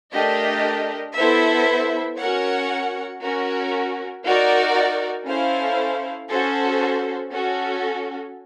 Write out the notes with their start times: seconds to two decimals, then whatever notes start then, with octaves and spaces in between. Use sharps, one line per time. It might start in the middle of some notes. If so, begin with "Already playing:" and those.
0.12 A3 D4 G4 A#4 D#5
1.15 B3 E4 A4 C5 E5
2.18 C#4 F#4 A#4 C#5 F#5
3.21 C#4 F#4 A#4
4.23 D#4 F#4 A#4 D5
5.26 C#4 E4 A4 C5 F5
6.29 C#4 F#4 A4 C5
7.32 C#4 F#4 A4